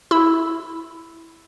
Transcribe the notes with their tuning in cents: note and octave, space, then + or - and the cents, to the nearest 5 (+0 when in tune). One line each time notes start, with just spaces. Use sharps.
E4 +0 B5 +10 E6 -5